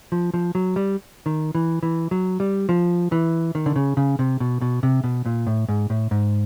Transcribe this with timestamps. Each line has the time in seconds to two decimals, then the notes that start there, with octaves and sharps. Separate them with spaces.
0.12 F3
0.34 F3
0.55 F#3
0.76 G3
1.26 D#3
1.55 E3
1.83 E3
2.11 F#3
2.40 G3
2.69 F3
3.12 E3
3.55 D#3
3.66 D3
3.76 C#3
3.97 C#3
4.19 C3
4.40 B2
4.61 B2
4.83 C3
5.04 B2
5.26 A#2
5.47 A2
5.68 G#2
5.90 A2
6.11 G#2